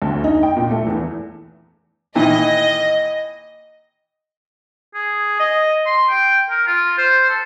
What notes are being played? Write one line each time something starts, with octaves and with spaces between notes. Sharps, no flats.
D2
D#4
G5
A#2
A3
E2
A#2 D#3 E3 D#5
G#4
D#5
C6
G5
A#4
F4
C5
A4